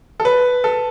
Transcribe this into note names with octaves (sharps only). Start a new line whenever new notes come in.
A4
B4
A4